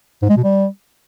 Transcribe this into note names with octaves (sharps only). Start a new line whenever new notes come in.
G#2
G#3
B2
G3